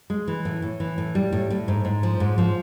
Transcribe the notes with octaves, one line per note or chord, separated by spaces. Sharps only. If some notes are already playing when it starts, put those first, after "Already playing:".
G#3
E3
A2
A2
E3
A2
G3
A2
A2
G#2
G#2
F3
G#2
F3